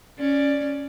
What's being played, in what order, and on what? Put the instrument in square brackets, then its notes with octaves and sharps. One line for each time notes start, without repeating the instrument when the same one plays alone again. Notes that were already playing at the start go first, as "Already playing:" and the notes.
[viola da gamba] C#4 D5